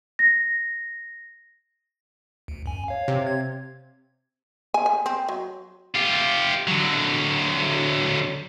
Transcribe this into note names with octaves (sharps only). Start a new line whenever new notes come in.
A#6
D2
F#2 G#5
C#5 F5
C3
G#6
G#5
G#5
C4
F#3
F4 G4
D3 F#3